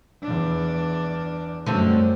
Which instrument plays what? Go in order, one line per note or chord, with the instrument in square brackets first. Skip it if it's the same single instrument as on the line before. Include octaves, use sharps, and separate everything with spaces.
[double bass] E2 D4
[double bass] F#2 G3 [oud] D3 A3 C4